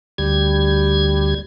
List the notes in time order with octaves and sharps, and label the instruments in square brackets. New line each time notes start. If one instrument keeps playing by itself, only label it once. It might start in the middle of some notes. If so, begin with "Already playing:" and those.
[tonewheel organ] D2 G3 G#6